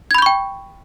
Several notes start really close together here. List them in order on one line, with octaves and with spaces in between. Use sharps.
G#6 B5 G6 C#6 G5